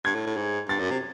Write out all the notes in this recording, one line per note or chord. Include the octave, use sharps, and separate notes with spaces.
G2 G#6
A2
A2
G#2
G2 A6
F#2
C3